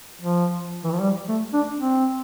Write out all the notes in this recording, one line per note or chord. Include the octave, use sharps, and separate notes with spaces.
F3
E3
F3
G3
A3
D4
C4